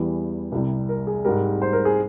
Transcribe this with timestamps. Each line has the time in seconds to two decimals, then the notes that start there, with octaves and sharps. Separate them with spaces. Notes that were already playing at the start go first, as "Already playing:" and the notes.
Already playing: E2 E3 G3
0.52 C2 C3 G3
0.89 A#4
1.07 G#4
1.25 G#2 G3 A#4
1.62 C5
1.73 A#4
1.85 G#4